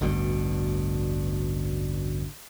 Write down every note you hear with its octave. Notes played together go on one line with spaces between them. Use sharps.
A1 D2 G2 B2